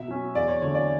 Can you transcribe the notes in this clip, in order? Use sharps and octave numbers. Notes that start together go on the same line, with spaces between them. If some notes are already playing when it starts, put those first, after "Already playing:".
Already playing: B2 E5
F#3 C#4
E2 D5
C#5
D3 F#3 A3 C#5
D5